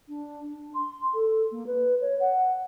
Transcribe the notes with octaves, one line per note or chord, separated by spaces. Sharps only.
D4
D4
C6
A4
A#3
B4
C#5
F#5